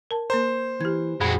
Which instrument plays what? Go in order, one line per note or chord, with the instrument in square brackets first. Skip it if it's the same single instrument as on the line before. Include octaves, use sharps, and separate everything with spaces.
[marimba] A#4 A5
[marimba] A#3 A#4 A#5 [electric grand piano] C5
[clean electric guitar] E3 [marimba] G4 G#6
[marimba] F2 A#2 [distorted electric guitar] G#3 F#4 [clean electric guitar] B5